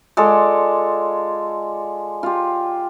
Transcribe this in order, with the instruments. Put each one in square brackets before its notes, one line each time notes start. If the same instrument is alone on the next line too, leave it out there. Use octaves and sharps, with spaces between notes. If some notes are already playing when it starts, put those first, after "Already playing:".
[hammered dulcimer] G#3 F4 A4 D5
F4 G4